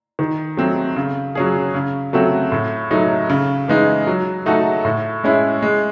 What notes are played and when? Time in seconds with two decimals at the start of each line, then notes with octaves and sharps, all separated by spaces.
0.19 D#3
0.57 F#3 A3 C4
0.96 C#3
1.35 F#3 C#4 G#4
1.74 C#3
2.13 F#3 A3 C4 F#4
2.52 A2
2.91 F#3 A3 D#4
3.30 C#3
3.68 E3 G#3 D#4
4.07 F#3
4.46 A3 D#4 F#4 A4
4.85 A2
5.24 G#3 C#4 E4
5.62 G#3